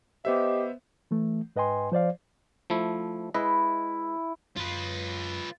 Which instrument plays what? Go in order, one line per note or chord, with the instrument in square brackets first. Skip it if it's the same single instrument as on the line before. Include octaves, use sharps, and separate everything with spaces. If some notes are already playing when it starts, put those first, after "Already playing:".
[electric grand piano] B3 C5 E5 [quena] G4 [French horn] D#5
[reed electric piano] E3 A3
G#2 B4 D#5 G5 G#5 C6
F3 C5 D5 F5
[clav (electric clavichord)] F3 A3 E4
[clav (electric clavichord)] G#3 B4 D#5 [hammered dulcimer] E4
[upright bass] F#2 [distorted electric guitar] F4 B4